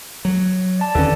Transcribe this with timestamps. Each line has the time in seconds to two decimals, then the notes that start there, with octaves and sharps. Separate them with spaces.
0.25 F#3
0.79 D5 A5
0.95 D#2 D3 C#4 A4 B4 D5